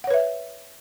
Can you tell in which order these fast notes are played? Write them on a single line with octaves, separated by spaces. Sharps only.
F#5 C#5 B4 E5